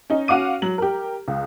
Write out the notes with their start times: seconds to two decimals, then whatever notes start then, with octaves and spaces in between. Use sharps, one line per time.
0.10 C#4 D#4
0.28 C#4 F#4 F5 F#5 D6 D#7
0.62 F#3 F#7
0.78 G4 A#4
1.28 C#2